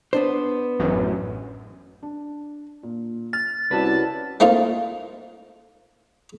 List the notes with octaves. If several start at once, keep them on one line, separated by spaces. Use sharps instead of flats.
B3 D4 C5
A1 F#2
D4
A#2
F6 A6
C2 C#4 E4 F#4 B4 D5 A5
A3 A#3 C4 D#4 F4 F5